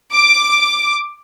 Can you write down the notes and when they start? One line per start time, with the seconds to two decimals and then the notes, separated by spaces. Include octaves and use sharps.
0.13 D6